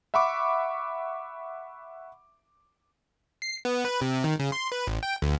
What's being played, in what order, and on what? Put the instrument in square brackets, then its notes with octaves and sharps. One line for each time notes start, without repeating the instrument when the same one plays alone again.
[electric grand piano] E5 F#5 B5 C#6 D6
[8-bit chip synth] C7
B3
B4
C3
D#3
C#3
C6
B4
A1
G5
D2